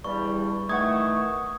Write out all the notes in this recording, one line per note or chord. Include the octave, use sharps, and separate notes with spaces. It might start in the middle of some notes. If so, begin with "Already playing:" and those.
E2 G2 G3 C#6
D#3 E3 A3 F#5 C#6 D#6 G#6